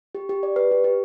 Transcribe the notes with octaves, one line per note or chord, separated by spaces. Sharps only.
G4
G4
D5
B4
G4
G4